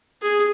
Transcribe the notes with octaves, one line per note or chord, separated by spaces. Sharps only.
G#4